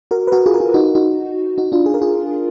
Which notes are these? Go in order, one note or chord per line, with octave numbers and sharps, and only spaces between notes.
F#4 A#4
B4
F#4 A#4
F4 G#4
A#4
F4 G#4
D#4 F#4
D#4 F#4
D#4 F#4
D4 F4
G#4
A#4
F4 G#4